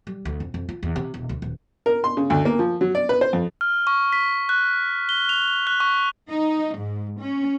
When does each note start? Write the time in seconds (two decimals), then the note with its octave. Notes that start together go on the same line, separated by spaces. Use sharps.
0.07 G3
0.25 D2
0.40 F2
0.54 F2
0.69 F4
0.83 E2
0.96 C3
1.14 E1
1.29 D2
1.42 D#1
1.86 A#4
2.04 C6
2.17 C#3
2.30 D2
2.45 A#3
2.59 F3
2.81 F#3
2.95 D5
3.09 B4
3.21 C5
3.33 F2
3.61 F6
3.87 C#6
4.13 B6
4.49 F#6
5.09 G7
5.29 F7
5.67 F#6
5.80 C#6
6.30 D#4
6.77 G#2
7.20 C#4